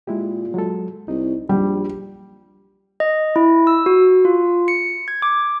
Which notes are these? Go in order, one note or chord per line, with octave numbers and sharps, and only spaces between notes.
A#2 G#3 E4 G4
F#3 G#3 A4
C2 D#4
A#1 G3
D#5
E4
E6
F#4
F4
C#7
G#6
D6